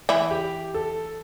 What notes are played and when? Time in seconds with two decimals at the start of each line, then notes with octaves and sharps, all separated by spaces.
0.09 E3 E4
0.30 G4
0.74 A4